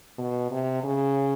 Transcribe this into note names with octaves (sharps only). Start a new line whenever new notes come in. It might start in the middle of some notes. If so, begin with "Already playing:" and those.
B2
C3
C#3